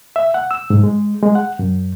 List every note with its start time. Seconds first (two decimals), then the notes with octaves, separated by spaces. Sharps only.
0.16 E5
0.34 F#5
0.51 E6
0.70 G#2
0.84 G#3
1.22 G#3
1.35 F#5
1.59 F#2